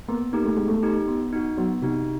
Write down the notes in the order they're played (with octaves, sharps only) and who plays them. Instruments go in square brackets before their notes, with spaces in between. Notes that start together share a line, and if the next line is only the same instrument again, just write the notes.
[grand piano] A#3 [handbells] B3
[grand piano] A#3 [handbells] D#4 G4
[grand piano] A3
[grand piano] G#3 [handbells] B3
[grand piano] A3
[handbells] D#4 G4
B3
D#4 F#4
[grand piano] F#3 [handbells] B3
[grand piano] C3 [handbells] D#4 F#4